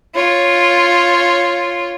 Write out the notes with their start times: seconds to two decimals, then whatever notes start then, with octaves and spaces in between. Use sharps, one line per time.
0.15 F4 C#5